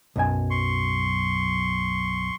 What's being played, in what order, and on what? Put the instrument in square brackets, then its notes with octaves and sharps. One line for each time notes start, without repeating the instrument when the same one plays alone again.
[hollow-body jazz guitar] B1 F#2 G#5
[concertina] C6 C#6